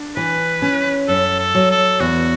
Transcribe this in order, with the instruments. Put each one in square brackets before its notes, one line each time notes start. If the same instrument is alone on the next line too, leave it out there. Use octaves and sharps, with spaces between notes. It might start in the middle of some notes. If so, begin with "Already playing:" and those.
Already playing: [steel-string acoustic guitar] D4
[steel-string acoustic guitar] E3 [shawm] B4
[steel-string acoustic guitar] C#4
[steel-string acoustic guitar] F#2 [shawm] A4
[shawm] A4
[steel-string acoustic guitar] F#3
[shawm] A4
[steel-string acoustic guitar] E2 [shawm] F#4